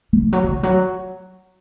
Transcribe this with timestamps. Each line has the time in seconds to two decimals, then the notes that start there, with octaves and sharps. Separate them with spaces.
0.13 E3
0.33 F#3
0.44 F#3
0.49 E3
0.63 F#3